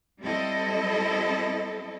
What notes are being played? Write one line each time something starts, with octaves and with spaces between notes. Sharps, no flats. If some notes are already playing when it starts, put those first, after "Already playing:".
G3 C4 E4 A4 D#5